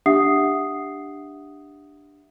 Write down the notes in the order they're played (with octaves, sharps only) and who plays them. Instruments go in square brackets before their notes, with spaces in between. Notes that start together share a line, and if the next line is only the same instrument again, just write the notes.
[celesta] D4 G4 E5 F#5 D#6 C7